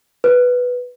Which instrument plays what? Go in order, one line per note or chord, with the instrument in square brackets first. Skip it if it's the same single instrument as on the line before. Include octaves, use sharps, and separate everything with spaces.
[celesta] B4